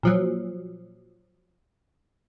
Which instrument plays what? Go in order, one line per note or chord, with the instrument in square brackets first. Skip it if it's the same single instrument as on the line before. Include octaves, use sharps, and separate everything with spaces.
[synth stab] A#2 F3 F#3